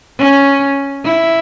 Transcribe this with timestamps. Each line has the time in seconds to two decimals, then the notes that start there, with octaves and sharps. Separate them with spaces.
0.18 C#4
1.04 E4